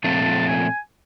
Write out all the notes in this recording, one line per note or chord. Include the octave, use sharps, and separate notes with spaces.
A#2 F3 A3 C4 A5
A5
G#5